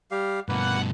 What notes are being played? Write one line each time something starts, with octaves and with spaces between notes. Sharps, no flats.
G3 G4 F5
G2 B2 A#3 B4 F#5